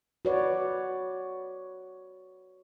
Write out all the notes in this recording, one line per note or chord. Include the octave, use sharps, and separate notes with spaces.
F#4 B4 C#5 D5